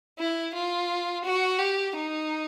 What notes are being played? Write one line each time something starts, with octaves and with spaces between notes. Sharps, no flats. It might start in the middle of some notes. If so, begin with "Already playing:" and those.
E4
F4
F#4
G4
D#4